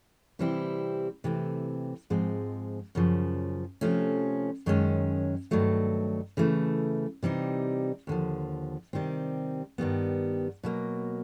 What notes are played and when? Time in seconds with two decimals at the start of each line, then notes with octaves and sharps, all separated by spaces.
0.39 C3 E3 G3 C4 E4
1.24 C3 E3 A3 C4
2.10 G#2 F3 G#3 C4
2.95 F#2 C#3 F3
3.81 C3 F3 A3 C#4
4.66 F#2 D#3 G#3 C#4
5.51 G2 D#3 F#3 A3
6.37 C#3 E3 A3
7.23 C3 E3 G3 C4 D#4
8.07 D#2 D3 F3
8.93 C3 D#3 G3 C4
9.78 G2 D#3 G3 B3
10.63 B2 F#3 A#3